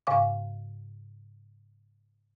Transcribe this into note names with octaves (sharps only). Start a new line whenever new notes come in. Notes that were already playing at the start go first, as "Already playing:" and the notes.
G#2 C#3 F5 D6